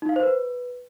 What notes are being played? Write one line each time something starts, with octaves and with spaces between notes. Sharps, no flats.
D#4
F5
C5
B4